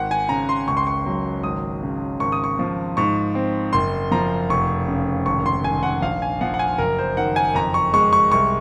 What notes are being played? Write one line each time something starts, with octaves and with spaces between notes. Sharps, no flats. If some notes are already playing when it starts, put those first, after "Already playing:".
Already playing: G#1 F#5
G#5
C#3 A#5
C6
C#2 C#6
C6
C#6
F#3
G#1 D#6
C#3
G#1 C#6
D#6
C#6
F3
G#2 C#6
C4
F#1 C6
F3 A#5
F1 C#6
C#3
G#1 C#6
C6
D#3 G#5
F#5
A#1 F5
G#5
F3 F#5
F#5
G#5
F#1 A#4
C5
D#3 F#5
G#5
F2 A#5
C#6
G#3 C#6
C#6
C2 C#6